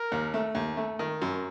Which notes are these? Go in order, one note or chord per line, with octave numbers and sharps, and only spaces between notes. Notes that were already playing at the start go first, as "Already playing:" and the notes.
Already playing: A#4
D#2
A3
D#2
A3
D#3
F#2